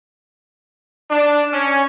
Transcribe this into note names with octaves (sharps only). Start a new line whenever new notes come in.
D4
C#4